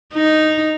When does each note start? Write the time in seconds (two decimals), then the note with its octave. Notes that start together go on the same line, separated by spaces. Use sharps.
0.14 D#4